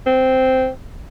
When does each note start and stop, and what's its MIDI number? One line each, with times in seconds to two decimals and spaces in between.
0.07 0.69 60